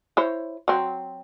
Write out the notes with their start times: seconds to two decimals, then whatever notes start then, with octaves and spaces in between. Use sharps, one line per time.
0.17 E4 C5 C#5
0.68 F#3 C4